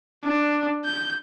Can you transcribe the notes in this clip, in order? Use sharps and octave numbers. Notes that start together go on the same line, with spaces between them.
D4
G6